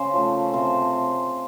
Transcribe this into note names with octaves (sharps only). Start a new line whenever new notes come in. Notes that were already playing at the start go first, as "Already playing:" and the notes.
Already playing: C#3 C5
F3 A3
C3 C5